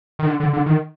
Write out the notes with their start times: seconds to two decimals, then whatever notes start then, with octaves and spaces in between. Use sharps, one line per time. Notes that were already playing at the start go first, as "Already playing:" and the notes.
0.19 D#3
0.26 D3
0.40 D3
0.53 D3
0.66 D#3